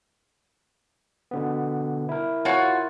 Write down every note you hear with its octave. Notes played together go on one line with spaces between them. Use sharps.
B2 D3 B3
E4 A#4
F4 F#4 C#5